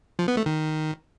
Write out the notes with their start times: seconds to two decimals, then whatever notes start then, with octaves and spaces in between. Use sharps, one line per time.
0.19 F3
0.28 B3
0.37 A3
0.46 D#3